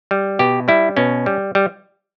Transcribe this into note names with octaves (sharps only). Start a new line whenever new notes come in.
G3
B2 G4
G3 E4
B2 C#4
G3
G3